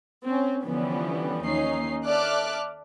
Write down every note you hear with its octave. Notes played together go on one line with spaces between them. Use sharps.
C4 C#4
D3 E3 F3 G3 B3 C#4
D#2 C#4 D#4 C7
A4 D5 E5 D6 F6 F#6